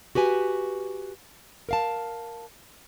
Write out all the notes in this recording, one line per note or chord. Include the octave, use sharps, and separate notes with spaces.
F#4 G4 B4 G#5
A#4 F5 A5